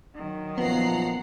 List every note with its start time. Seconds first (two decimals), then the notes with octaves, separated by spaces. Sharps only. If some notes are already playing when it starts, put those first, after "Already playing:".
0.15 D#3 F#3
0.58 F#2 A#2 F3 B3 F#5 A#5 C7